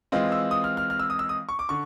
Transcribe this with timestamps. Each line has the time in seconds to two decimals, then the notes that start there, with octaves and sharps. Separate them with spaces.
0.12 E3 G#3 C4 F4
0.32 E6
0.51 D#6
0.64 F6
0.77 F6
0.90 F6
1.00 E6
1.10 D#6
1.19 E6
1.29 D#6
1.49 C#6
1.59 D6
1.69 D3 C#6